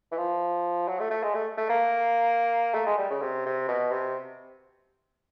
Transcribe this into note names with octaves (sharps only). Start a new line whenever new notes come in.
E3
F3
F#3
A3
A3
G#3
A3
A3
A#3
A3
G#3
G3
C#3
C3
C3
B2
C3